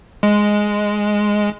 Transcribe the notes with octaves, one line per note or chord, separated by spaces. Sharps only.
G#3